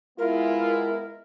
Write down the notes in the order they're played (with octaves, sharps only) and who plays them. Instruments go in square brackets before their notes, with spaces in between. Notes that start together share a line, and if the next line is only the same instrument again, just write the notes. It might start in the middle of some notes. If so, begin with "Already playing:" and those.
[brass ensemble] G#3 B3 E4 [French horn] F4 [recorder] A#4